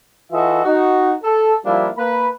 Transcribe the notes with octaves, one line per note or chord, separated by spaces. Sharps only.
E3 F4 F#4 A4 D#5 E5
D#4 F#4
A4
F3 G3 A#3 D4 E4
A#3 B4 B5